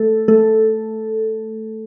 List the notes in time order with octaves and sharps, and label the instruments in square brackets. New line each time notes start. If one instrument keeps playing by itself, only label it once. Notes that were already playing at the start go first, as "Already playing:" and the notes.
Already playing: [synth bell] A3 A4
A3 A4